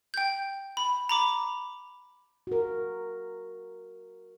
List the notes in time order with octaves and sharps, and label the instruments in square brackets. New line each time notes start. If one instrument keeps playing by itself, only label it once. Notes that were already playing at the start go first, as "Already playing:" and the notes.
[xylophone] G5 G6
B5
A#5 B5 D6
[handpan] F#4 A#4